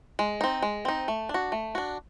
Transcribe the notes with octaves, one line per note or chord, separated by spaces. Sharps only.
G#3
C4 D#4
G#3
C4 D#4
A3
D4
F#4
A3
D4 F#4